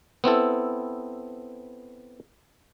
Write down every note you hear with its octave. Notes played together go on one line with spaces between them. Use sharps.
B3 C4 E4 A4